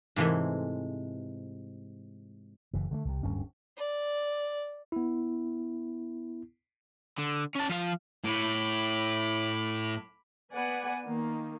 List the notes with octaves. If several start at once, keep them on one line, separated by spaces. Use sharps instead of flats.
G#2 C3 E3 G#3 A3
F#1 E3
D3 G#3 A3
C2 C3
D1 G2 C#4
D5
B3 E4
D3
C#4 A5
F3 F5
A2 B5 D6
B3 B4 D5 F#5 G#5
D#3 A#3